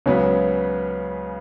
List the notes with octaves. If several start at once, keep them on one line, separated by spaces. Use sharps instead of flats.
C#2 C#3 F#3 B3